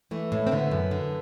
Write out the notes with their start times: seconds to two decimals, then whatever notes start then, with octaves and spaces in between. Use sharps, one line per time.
0.11 E3 A3
0.32 A2
0.47 C4
0.52 D3 B3
0.71 F#2
0.91 D3